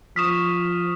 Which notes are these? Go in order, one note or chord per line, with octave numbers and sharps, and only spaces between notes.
F3 C#6 D#6 F6 B6 E7